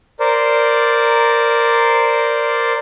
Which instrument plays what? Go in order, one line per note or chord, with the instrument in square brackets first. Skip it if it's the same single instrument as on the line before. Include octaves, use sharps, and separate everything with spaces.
[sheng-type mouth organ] A#4 C5 D5